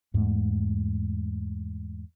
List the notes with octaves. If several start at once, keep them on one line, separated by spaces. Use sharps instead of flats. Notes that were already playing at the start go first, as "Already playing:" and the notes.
E2 G#2 A3